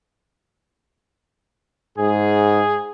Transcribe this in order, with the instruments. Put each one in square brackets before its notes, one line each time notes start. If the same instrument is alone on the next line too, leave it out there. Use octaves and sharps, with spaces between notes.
[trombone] G#2 [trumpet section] G#4